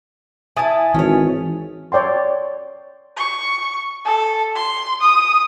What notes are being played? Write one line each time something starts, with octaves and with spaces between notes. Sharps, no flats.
E4 G#5 A5 D#6 A6
G#1 E3 C#4 C#5
C#5 D5 G5 C6
C#6
A4
C6
D#6